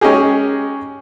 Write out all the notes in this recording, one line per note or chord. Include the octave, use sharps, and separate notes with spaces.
G#3 C#4 D#4 G4 G#4